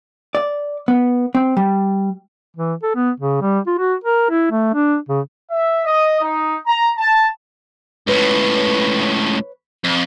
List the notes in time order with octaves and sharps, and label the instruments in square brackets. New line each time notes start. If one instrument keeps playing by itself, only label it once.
[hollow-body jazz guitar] D5
B3
C4
G3
[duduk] E3
A4
B3
C#3
G3
F4
F#4
A#4
E4
A3
D4
C#3
[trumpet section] E5
D#5
D#4
A#5
A5
[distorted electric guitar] C#2 A2 [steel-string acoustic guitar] B4 C#5
[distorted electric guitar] F2